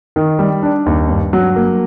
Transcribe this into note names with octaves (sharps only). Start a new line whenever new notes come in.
D#3
G3
D4
D#2
G2
F#3
A#3